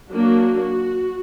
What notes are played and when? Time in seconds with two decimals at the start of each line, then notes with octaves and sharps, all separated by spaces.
0.11 F#3 A#3 D4 F#4